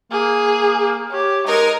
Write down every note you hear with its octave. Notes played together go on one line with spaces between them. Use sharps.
A#3 G#4
G4 C#5
G#3 D#4 A#4